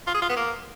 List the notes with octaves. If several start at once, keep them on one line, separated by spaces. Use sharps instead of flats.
F4
G#4
F4
B3
A#3